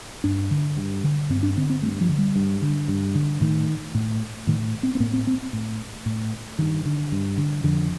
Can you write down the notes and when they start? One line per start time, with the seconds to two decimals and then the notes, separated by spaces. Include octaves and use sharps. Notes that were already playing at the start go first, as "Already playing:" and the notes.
0.24 G2 D4
0.51 D3
0.77 G2
1.04 D3
1.30 G2 C4
1.43 D4
1.57 D3 C4
1.70 C4
1.82 G2 A3
2.01 F3
2.09 D3
2.18 G3
2.36 G2
2.62 D3
2.88 G2
3.15 D3
3.41 A2 D#3
3.95 A2
4.47 A2 D#3
4.83 C4
4.95 C4
5.00 A2 A#3
5.13 C4
5.27 C4
5.53 A2
6.06 A2
6.59 G2 D#3
6.85 D3
7.12 G2
7.38 D3
7.64 F2 D3